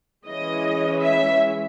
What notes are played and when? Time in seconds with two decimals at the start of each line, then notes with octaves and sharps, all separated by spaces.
0.27 E3 G#3 C#4 D#5
1.03 E5